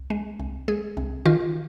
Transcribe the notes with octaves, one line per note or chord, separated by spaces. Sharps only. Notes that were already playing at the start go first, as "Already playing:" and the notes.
Already playing: C2
G#3
C2
G#3 G#4
C2
D#3 F4